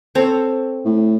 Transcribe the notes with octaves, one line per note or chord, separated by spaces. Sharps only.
C4 A4 C#5
A2